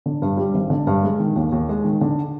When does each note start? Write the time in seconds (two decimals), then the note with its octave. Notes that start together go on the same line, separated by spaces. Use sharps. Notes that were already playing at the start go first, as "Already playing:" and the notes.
0.06 D3
0.22 G2
0.37 G3
0.54 G#1
0.70 D3
0.87 G2
1.03 G#3
1.20 D#3
1.36 D#2
1.52 D#2
1.69 G#3
1.84 D#3
2.01 D3